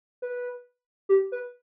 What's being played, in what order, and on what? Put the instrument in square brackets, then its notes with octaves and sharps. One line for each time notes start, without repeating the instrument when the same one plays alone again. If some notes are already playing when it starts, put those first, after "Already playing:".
[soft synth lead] B4
G4
B4